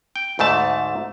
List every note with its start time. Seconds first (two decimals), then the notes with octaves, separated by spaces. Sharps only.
0.16 G5
0.39 D2 G#2 A3 A5